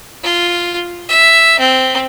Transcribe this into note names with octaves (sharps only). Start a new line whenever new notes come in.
F4
E5
C4